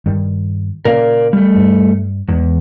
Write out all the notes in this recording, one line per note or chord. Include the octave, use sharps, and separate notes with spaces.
G2 D#3 G3
A#2 C#3 A#3 A#4 D5 F5
G3 A3
G2
E2 E3 G#3